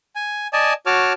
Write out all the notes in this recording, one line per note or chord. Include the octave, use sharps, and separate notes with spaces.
G#5
D5 D#5 G#5 A5
F#4 C#5 A5 D6 F6